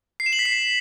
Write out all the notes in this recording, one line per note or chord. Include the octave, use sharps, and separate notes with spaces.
C7
E7
F#7
B6
C7